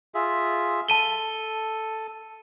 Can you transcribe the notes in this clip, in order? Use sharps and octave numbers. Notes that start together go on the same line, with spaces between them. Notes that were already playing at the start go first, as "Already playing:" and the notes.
F4 G#4 E5
A4 A5 D#7 G7